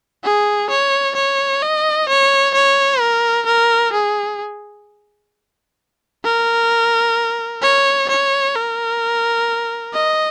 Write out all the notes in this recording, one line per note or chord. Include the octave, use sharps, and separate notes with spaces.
G#4
C#5
C#5
D#5
C#5
C#5
A#4
A#4
G#4
A#4
C#5
C#5
A#4
D#5